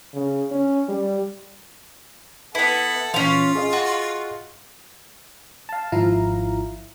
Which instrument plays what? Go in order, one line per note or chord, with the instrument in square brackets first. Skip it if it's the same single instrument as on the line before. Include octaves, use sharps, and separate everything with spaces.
[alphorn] C#3
C#4
G3
[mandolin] B3 E4 [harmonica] A4 F#5 [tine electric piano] B4
[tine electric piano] A#2 E3 [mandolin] C#4 F5 [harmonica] F4
[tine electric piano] G#4 D#5 F5
[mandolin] F#4
[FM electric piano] F5 A5
G#1 F3 E4 F5 A#5